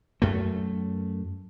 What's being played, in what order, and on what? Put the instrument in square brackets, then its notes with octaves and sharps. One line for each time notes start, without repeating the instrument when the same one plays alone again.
[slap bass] F#2 A3